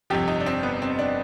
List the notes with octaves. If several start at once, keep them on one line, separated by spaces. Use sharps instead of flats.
G1 F2 C3 F3 G4
D#4
D4
C4
B3
C4
D4